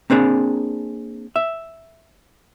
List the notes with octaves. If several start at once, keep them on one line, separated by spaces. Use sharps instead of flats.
A#3 C4 D4 G#4
E5